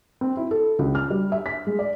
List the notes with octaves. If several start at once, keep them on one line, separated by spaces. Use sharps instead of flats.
C4
E4
A4
C#2
F6
G3
E5
B6
G#3
D5